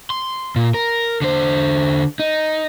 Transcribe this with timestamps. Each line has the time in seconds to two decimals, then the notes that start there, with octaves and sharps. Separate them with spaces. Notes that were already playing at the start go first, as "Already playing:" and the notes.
0.10 C6
0.56 A#2
0.74 A#4
1.22 D3 C5
2.19 D#4